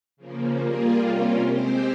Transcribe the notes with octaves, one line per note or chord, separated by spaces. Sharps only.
C#3 F3 A#3
G3 A#3 F4 G#4
C3 G3 A#3 C#4 F4
G#3 C4 G4 C5